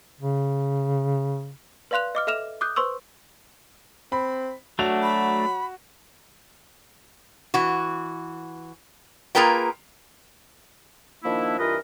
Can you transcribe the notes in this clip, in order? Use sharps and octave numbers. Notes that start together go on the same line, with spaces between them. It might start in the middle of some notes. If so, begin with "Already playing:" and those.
C#3
B4 D5 F5 C6 F#6 F7
D#5 D6 F6
A4 E5 F6 E7 F7
D6 D#6 F#6 G6
B4 C5 C6 C#6 E6
C4 B5
F#3 A3 D4 F#4 F7
B5
E3 F#4
A#3 F4 G#4 A#4 B4 G5
D#3 F3 A#3 D4 E4
G2 E3 F4 A#4 B4 D#5